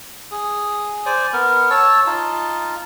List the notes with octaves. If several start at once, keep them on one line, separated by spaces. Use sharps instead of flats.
G#4
C5 D5 G#5
B3 A#4
C#5 A5 E6
D#4 F4 A5